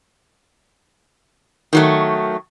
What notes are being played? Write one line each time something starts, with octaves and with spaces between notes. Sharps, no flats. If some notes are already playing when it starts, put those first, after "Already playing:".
D#3 F#3 A3